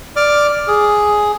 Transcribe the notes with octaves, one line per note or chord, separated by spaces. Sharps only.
D5 D6 F6
G#4